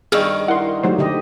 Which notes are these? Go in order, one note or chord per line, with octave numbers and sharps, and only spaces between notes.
G2 D#3 G#4 C#6 E6 F6
E4 A#4 D#5 F#5 C6
F#3 A3 D#4 G4 C5
D3 G4 D#5